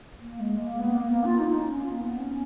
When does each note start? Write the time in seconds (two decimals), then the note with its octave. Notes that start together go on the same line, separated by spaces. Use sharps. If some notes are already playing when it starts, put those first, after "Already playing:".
0.20 A#3
0.40 G#3
0.60 A#3
0.80 B3
0.94 A#3
1.09 A#3
1.25 F4
1.39 D#4
1.58 C#4
1.79 A#3
1.99 B3
2.18 C#4